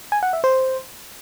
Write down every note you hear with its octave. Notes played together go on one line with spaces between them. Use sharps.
G#5
F#5
E5
C5